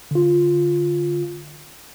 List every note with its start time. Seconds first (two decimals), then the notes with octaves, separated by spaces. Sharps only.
0.11 D3 F4